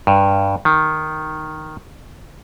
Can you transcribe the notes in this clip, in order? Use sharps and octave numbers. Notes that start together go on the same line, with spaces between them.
G2
D#3